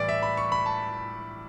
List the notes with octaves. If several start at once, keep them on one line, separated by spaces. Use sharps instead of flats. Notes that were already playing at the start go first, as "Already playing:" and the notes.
Already playing: A2 E3 G3 D5
E5
B5
C#6
B5
A5